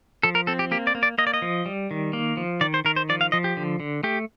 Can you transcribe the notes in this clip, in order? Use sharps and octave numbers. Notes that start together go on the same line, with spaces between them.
F3 A4
A#4
C4 A4
G4
A#3 G4
D5
A#3
D5
A#3 D#5
D5
D#5
F3
G3
D#3
A#3
F3
D#3 D5
C5
D#3 A#4
C5
F3 D5
F5
F3 D#5
G4
D3
D3
A3 G4